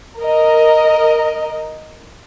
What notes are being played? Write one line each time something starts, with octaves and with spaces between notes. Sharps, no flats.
A#4 D#5